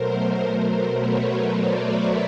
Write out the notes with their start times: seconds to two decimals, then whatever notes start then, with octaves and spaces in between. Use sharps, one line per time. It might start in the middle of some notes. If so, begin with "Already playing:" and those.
Already playing: B2 F#3 A3 A#4 C5
0.43 A#4 C5
0.99 B4 C#5
1.56 C5 D5
1.83 D5 E5